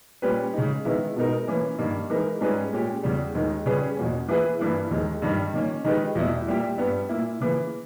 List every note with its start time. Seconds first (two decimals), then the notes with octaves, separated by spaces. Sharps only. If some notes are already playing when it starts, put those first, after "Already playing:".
0.22 A#2 G3 C#4 G4 B4
0.53 C#3 G#3 D#4
0.85 D#3 G#3 B3 E4
1.16 B2 G#3 B3 D#4 A#4
1.48 E3 A#3 C#4
1.78 G2 D#3 A#3
2.10 E3 G#3 D#4 A#4
2.41 G#2 G3 C#4 G#4 B4
2.72 A#2 G#3 C#4 G4
3.03 E2 C#3 G3
3.35 D#2 D#3 G#3 D#4
3.66 C#3 G3 C#4 G#4 B4
3.97 E2 B2 A#3 C#4
4.28 E3 A#3 E4 G#4 B4
4.59 G2 E3 A#3 E4
4.91 D#2 D#3 G#3
5.22 G2 D#3 G3
5.53 D#3 A#3 C#4
5.84 D#3 G#3 D#4 G4 B4
6.15 E2 B2 G3 A#3 E4
6.47 A#2 G3 A#3 E4 G4
6.78 G2 G3 B3
7.09 A#2 A#3 E4
7.40 C#3 E3 A#3